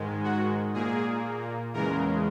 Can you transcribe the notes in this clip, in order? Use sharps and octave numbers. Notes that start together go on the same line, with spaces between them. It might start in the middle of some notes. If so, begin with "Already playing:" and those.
Already playing: G#2 D#3 G#3
F#4
A#2 A#3 G#4
E2 C#3 G#3 A#4